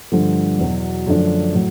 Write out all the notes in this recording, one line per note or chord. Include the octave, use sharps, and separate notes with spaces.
G2 D3 F3 A3
E2 B2 F#3
F#2 D3 F3 A3 D4
A2 F#3 A3